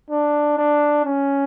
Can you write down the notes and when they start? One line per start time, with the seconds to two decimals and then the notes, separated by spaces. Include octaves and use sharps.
0.10 D4
0.57 D4
1.05 C#4